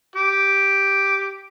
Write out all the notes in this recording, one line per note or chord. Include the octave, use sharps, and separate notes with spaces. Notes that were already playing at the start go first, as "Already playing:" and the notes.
G4